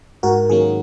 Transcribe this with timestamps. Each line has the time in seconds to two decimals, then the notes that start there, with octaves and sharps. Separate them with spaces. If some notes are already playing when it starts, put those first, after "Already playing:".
0.23 G#2 F#4 A#4
0.49 D#3 F#3 A#3 C#4 G#4